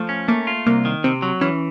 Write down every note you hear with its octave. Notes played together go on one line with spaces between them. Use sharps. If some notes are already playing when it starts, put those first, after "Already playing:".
Already playing: F3 A3
C#4
A3 A#3
F4
C2 A#3
D#3
C3 C4
F#3
E3 C#4